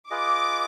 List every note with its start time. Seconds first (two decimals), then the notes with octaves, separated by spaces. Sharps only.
0.11 F4 G#4 B4 D#5 D6